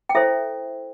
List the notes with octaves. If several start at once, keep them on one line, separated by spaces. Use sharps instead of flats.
G5
E4 A4 C5 E5